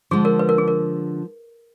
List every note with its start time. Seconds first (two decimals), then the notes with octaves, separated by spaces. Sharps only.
0.11 D3 F3 G#3 G#4
0.25 A#4
0.39 B4
0.49 A#4
0.58 G#4
0.68 A#4